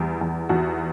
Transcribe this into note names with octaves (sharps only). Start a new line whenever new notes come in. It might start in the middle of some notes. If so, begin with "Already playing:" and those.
Already playing: E2 G3
E2
E2 F#4